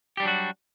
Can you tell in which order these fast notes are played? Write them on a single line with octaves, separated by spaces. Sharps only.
G4 G3 D4 F#3 F#4